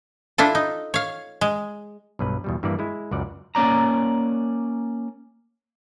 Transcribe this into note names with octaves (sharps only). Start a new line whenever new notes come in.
D4 E4 F4 A4
D#4
C#5 F5
G#3
B1 G2 B4
E2 B2 G3
G2 E3 A#3 D5
G#3 E4
C#2 F#2 D5 F#5
A#3 C#4 D5 A#5